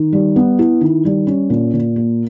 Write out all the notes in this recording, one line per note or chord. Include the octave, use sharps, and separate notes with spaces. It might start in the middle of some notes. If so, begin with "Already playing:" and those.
Already playing: D#3
G3
B3
E4
D#3
G3
C#4
A#2
A#2
A#3